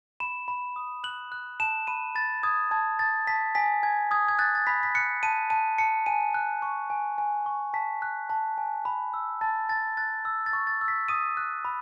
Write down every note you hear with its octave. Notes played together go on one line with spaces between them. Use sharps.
B5 E7
B5
D#6
F#6 F#7
F#6
A5 E7
B5 D#7
B5 A6
D#6 G#6
A5 G#6
A5 A6
A5 B6
G#5 B6
G#5 G#6
D#6 G#6
G#6
F#6 A6
A6
B5 B6
B6
F#6 C#7
A5 D#7
A5 D#7
A5 C#7
G#5 D#7
F#6
C#6
G#5
G#5
C#6
A5 B6
F#6
A5
G#5
B5
E6
A5 A6
A5 A6
F#6 A6
E6
A6
C#6
A6
E6
B6
D#6 D#7
F#6
B5